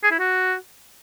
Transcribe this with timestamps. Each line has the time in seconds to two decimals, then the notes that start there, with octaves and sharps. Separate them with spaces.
0.04 G#4
0.11 E4
0.19 F#4